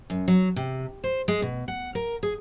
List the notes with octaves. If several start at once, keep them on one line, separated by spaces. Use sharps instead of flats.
F#2
F#3
C3
C5
G#3
B2
F#5
A#4
G#4